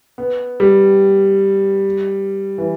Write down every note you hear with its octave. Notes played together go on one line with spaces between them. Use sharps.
B3
G3
E3